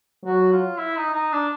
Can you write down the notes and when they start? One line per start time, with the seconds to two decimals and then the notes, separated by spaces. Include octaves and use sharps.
0.24 F#3 F#4
0.52 F4
0.78 E4
0.96 D#4
1.13 D#4
1.32 D4